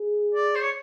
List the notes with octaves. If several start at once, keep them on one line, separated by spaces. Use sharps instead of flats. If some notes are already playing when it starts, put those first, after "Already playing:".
Already playing: G#4
D5
C5
C#5